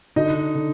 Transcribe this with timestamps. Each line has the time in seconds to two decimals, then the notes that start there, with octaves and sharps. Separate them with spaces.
0.16 D3 D#4 D#5
0.55 D3